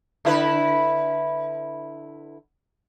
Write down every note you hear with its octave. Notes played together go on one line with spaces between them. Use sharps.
D3 E4 B4